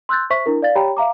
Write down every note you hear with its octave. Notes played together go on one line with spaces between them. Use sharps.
C6 E6 F#6 G6 A6
C5 E5 C#6 B6
D4 E4 A#4
D5 F5 A6
G4 C#5 G5 A#5 B5
E5 F5 A#5 D6